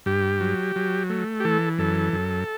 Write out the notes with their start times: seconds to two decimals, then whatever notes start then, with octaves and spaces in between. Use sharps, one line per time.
0.06 G2 G4
0.41 F#3
0.76 F#3
1.10 A3
1.40 G4
1.45 E3 A4
1.79 F#2 A4
2.13 F#2